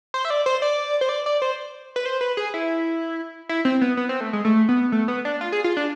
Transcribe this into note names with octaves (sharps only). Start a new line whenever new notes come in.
C5
E5
D5
C5
D5
C5
D5
D5
C5
B4
C5
B4
G#4
E4
E4
C4
B3
B3
C4
A3
G#3
A3
B3
A3
B3
D4
F4
G#4
F4
D4